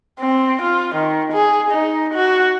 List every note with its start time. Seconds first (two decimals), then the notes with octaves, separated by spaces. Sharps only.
0.20 C4
0.62 F4
0.95 D#3
1.33 G#4
1.71 D#4
2.14 F#4